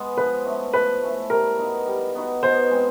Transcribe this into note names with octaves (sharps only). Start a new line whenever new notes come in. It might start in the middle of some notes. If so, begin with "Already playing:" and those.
Already playing: G#3 B3
F3 B4
A3 C#4 E4
F3 B4
A3 C#4 E4
G3 A#4
B3 D#4 F#4
G3
B3 D#4 F#4
B2 C5
G#3 C4